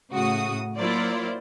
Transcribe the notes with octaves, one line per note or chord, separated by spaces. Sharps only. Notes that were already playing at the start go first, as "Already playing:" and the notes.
A2 C#3 F#4 D#6
F#3 A#3 E4 F4 C5 D5